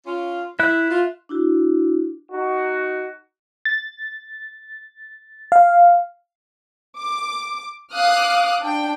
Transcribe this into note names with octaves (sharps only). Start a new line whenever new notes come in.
C#4 F4
E4 E5 F#6
F4
D4 E4 F#4
D#4 F#4
A6
F5
D6
F5 D6 D#6 F6 F#6
D4 G5